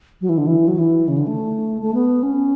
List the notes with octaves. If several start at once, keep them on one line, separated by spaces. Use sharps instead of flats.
F#3
E3
D3
E3
F#3
E3
C#3
D3
A3
A3
B3
C#4